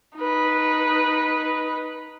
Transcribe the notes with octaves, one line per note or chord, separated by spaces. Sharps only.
D#4 B4